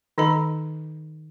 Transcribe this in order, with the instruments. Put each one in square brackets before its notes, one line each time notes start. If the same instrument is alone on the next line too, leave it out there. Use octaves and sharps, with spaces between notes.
[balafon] D#3 D#4 A4 D#5 B5